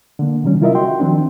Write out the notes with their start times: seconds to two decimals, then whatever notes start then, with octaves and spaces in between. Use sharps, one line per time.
0.19 D3 A#3
0.44 C3 D#3 F#3 G3 C#4
0.62 E4 F4 A#4 D#5 E5
0.75 F#4 G5 C6
1.00 D#3 F3 C4 D4